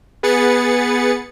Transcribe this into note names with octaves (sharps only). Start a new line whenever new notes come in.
B3 G#4 B4 A6 C#7